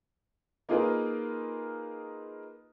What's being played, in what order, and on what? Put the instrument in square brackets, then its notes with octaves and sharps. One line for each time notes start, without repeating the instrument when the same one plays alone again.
[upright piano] A#3 D#4 F4 G#4 A#4 B4